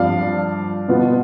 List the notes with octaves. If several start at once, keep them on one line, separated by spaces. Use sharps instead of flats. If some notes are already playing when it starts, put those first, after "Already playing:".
Already playing: G2 F3 C4 D5 F5
B2 B3 F4